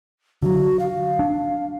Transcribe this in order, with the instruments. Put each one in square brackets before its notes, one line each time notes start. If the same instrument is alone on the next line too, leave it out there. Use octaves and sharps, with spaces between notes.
[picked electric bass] D3 F#3 [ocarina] F#4
[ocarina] F5
[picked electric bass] D4